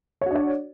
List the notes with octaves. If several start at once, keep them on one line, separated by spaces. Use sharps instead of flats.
D4 F#4 C#5 D5